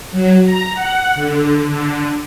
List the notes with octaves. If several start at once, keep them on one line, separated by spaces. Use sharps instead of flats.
F#3
A#5
F#5
D3
D3